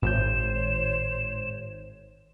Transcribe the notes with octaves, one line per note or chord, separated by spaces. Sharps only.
G#1 A2 C5 C#5 G6 E7